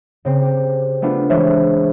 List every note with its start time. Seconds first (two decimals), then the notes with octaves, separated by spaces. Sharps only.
0.25 C#3 C4 C6
0.42 G4
1.02 A3 B3 D4 F4
1.30 E3 G#3 D4 C5 C#5 E5